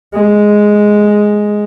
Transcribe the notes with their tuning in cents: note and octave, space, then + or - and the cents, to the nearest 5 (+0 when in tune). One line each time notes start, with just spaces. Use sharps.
G#3 +0